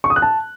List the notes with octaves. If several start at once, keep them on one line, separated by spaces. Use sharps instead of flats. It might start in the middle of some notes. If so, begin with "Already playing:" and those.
C#6
D#6
F#6
A5